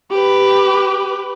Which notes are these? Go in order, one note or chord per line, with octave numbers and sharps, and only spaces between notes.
G4 B4